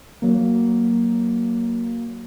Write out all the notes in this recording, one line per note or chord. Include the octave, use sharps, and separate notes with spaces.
F#3 A#3